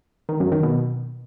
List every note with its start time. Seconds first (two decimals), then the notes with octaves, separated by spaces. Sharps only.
0.29 D#3
0.40 F#2
0.52 D#3
0.63 B2